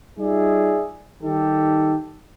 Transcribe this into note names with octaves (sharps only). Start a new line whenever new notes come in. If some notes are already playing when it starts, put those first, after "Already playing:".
G3 D#4 F4 G#4 D5 E5
D#3 G3 D#4 G4 A4